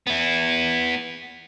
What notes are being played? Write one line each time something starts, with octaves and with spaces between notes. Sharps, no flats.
B3 E4